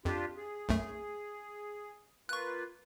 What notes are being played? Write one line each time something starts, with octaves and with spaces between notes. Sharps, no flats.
F2 D4 F4 G4
G#4
B1 F#2 A3
A#3 F4 B4 C#6 F#6